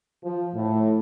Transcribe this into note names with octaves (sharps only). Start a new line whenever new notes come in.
F3
A2